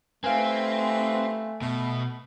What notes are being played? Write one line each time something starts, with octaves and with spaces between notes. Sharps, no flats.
A3 C4 D#4 G4 B4 F5 G#5
B2 A3